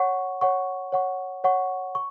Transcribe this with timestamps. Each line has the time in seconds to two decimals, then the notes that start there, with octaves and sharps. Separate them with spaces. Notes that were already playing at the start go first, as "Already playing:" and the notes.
Already playing: C#5 F#5 C#6
0.41 C#5 F#5 C#6
0.92 C#5 F#5 C#6
1.44 C#5 F#5 C#6
1.95 C#6